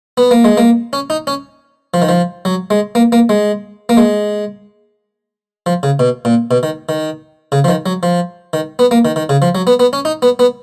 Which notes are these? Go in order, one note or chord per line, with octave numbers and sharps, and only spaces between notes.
B3
A#3
G#3
A#3
C#4
D#4
C#4
F3
D#3
F3
F#3
G#3
A#3
A#3
G#3
A#3
G#3
F3
C#3
B2
A#2
B2
D#3
D#3
C#3
F3
D#3
F#3
F3
D#3
B3
A#3
D#3
D#3
C#3
F3
F#3
B3
B3
C#4
D#4
B3
B3